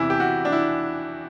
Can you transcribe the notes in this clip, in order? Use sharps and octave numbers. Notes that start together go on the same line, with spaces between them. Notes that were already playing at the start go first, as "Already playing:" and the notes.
Already playing: E2 C3 E3 E4
G4
F#4
D4
E4